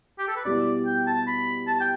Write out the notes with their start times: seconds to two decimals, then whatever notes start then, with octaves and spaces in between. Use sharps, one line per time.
0.19 G4
0.28 A4
0.36 B4
0.45 B2 G3 E4 D5
0.86 G5
1.07 A5
1.27 B5
1.67 A5
1.80 G5